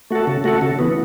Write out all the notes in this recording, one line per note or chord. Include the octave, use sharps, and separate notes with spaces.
A3 F#4 A4
C#3
A3 F#4 A4
C#3
E3 B3